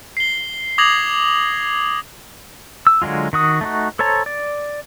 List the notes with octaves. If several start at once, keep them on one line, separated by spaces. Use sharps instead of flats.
C7 G7
D6 D#6 G#6 A#6 F7 F#7
E6
D3 F#3 G#3 F4
D#3 F#4 D#6
A3 D#4 F#4
A4 C5 C#5 A5 A#5
D5